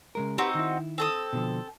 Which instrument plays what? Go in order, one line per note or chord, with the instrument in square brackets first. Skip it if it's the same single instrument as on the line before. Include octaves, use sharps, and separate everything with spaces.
[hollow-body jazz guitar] C#3 G#3 A#4
[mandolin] C4 D#4 F#4 [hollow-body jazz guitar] G4 B4
[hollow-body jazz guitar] D#3 E4
[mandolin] C4 A4 D#6
[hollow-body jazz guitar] B2 D3 F3